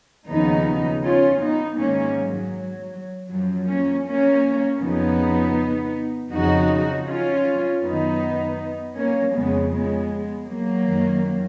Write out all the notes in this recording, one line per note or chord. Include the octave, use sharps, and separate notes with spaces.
D#2 C#3 F3 B3 D#4
C#4 F4
B3 D#4
G#2 D#3 A#3 C#4
F#3
F#2 F3 F#3
A#3 C#4
A#3 C#4
F2 C#3 F3 B3 D#4
F2 C#3 F3 D#4 F#4
C#4 F4
F#2 D#3 B3 D#4
A#3 C#4
F2 C#3 F3 G#3 B3
G#3 B3
F#3 A#3
F#2 D#3